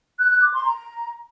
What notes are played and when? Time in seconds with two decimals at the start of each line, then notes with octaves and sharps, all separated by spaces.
0.19 F#6
0.31 F#6
0.42 D6
0.53 C6
0.65 A#5